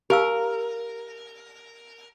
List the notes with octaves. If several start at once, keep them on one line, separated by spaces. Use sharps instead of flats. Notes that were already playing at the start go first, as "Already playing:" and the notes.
G4 A#4 F5 E6